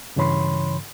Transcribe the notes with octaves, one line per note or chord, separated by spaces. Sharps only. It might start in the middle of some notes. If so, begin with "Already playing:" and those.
G2 C#3 E3 C#5 B5 C6